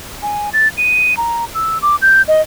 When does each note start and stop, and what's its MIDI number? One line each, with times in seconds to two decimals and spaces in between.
0.23 0.49 80
0.53 0.68 93
0.78 1.17 99
1.17 1.45 82
1.55 1.78 88
1.82 1.96 86
2.02 2.22 91
2.28 2.41 75